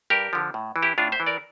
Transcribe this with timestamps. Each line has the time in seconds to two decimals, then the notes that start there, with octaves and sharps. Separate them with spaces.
0.10 G2 G4 A#4
0.33 D3 F3
0.54 A2
0.76 E3
0.83 E4 G4
0.98 A2 D4 F4
1.12 C5 E5
1.20 E3
1.26 A#4 D5